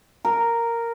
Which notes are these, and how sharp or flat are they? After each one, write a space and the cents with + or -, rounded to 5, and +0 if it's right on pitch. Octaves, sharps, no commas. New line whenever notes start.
A#4 -5